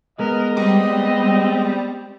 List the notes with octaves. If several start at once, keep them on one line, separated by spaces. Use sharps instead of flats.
G#3 B3 A#4 D#5
G3 C4